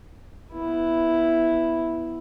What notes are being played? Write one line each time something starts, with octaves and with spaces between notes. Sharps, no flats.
B3 E4